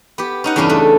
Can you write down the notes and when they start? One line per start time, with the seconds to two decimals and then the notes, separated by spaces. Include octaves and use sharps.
0.18 B3 G4
0.44 C#4 D#4 F#5
0.56 E2 G2 C#3 C#4 D4 B4
0.69 A3